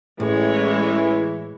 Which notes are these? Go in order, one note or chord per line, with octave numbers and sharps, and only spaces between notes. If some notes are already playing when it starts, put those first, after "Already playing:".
A1 A2 E3 G#3 C#5